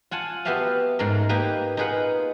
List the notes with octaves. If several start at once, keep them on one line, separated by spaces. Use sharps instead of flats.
F4 F#5 G#5 A5
B3 F#4 G4 E5 F5 A5
G#2 G#3 A3 A#4
A#3 D#4 G4 B4
D#4 F4 G#4 B4 F#5